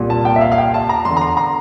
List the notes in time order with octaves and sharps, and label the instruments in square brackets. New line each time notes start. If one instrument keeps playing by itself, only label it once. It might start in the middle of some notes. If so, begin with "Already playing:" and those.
Already playing: [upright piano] C2 A#2
A5
G5
E5
F5
F5
G5
A5
A#5
E2 D3 C6
A#5
C6
A#5